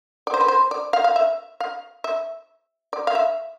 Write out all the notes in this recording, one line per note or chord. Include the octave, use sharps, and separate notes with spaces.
D5
C5
B4
C5
D5
F5
F5
E5
F5
E5
D5
F5
E5